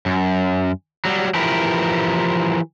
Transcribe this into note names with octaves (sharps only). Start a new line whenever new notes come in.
F#2
F#3 G3
E3 F3 E4 G4 A#4 B4